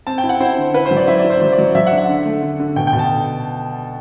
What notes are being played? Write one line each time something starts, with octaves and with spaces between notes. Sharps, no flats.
C4 A5
G5
E4
F#5
E4 C5
D3
E4 B4
C5
F#3
D5
E4 E5
D5
E4
C5
F#3 C5
D5
F#3
F#3 E5
F#5
D4
F#5
D3
A3
D3
D3
B2 G5
G5
B2
A5